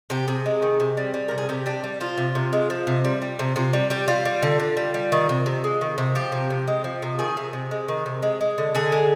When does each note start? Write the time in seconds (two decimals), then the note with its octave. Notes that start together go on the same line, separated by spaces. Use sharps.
0.10 C3 G4
0.28 C3 G#4
0.46 G#3
0.62 D#3
0.80 C3
0.97 G3
1.14 G3
1.28 C3 A#4
1.38 G#4
1.49 C3 G4
1.66 G3 D4
1.84 G3
2.00 F3 F4
2.18 C3
2.35 C3
2.53 G#3
2.70 F3
2.87 C3
3.05 G3
3.22 G3
3.39 C3
3.56 C3 F4
3.73 G3
3.90 G3 G4
4.08 G3 F4
4.25 G3
4.42 D3
4.60 D3
4.77 G3
4.94 G3
5.12 D#3
5.29 C3
5.46 C3
5.64 G#3
5.81 D#3
5.98 C3
6.15 F3 G4
6.32 C3
6.50 C3
6.68 G#3
6.84 F3
7.02 C3
7.19 D#3 G#4
7.37 C3
7.53 C3
7.71 G#3
7.88 D#3
8.06 C3
8.23 G#3
8.41 G#3
8.58 D3
8.75 D3 G#4
8.92 G#3